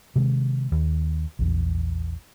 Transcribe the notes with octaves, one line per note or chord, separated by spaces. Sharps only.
C3 D#3 G#3
D#2
A#1 E2